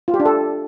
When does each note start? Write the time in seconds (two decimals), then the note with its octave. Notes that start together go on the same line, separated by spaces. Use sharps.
0.08 F4
0.14 G4
0.20 D4
0.25 A4